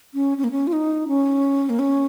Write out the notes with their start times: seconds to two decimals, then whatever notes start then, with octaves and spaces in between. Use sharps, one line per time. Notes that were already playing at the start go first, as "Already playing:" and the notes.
0.14 C#4
0.38 C#4
0.44 A#3
0.52 C#4
0.67 F4
0.73 D#4
1.08 C#4
1.69 A#3
1.79 C#4